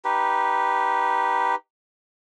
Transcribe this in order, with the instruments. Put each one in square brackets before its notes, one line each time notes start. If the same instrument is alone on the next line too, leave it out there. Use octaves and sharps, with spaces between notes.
[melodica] D#4 G4 B4